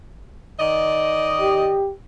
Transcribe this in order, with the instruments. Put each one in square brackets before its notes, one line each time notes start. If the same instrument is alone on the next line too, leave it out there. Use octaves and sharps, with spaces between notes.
[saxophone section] D#3 D5 D#5
[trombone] G4